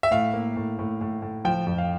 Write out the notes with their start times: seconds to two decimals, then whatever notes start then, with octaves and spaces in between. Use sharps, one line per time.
0.03 E5
0.11 A2 F5
0.34 A#3
0.56 A2
0.79 A2
1.01 A2
1.22 A2
1.45 F3 G5
1.67 F2
1.78 F5